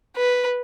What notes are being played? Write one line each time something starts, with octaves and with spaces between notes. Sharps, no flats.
B4